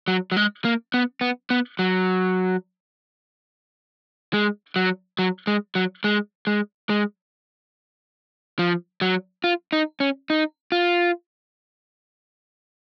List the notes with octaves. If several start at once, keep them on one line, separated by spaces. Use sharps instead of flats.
F#3
F#3
G#3
A#3
B3
B3
B3
F#3
G#3
F#3
F#3
G#3
F#3
G#3
G#3
G#3
F3
F#3
F4
D#4
C#4
D#4
F4